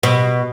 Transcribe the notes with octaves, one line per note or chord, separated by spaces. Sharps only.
B2